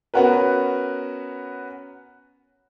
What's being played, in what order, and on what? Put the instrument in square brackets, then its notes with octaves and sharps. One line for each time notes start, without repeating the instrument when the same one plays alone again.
[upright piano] B3 C#4 F#4 A#4 B4